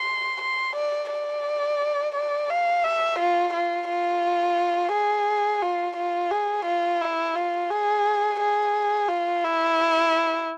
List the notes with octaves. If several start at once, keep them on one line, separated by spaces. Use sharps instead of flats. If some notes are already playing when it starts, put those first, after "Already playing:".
Already playing: C6
C6
D5
D5
D5
F5
E5
F4
F4
F4
G#4
F4
F4
G#4
F4
E4
F4
G#4
G#4
F4
E4